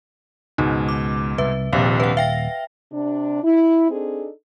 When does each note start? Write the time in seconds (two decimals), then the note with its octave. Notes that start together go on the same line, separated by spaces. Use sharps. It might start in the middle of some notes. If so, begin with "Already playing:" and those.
0.58 C#2 G#2 B2 D#4
0.89 D6
1.38 C2 B4 E5
1.73 D#1 A#1 C3 F5
2.00 B4 F#5
2.17 E5 F5 G5 A#6
2.93 C3 D4
3.44 E4
3.90 C4 D4 D#4 G#4 A4